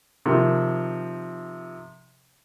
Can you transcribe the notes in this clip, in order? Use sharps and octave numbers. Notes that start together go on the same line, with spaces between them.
C3 D#3 F3